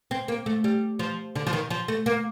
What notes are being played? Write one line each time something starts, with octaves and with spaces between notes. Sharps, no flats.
C4
A#3
A3
G3
F3
D3
F3
D#3
F3
A3
A#3